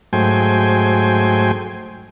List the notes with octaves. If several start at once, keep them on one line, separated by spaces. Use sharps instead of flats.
G#2 F#3 A3 C5 G5 G#5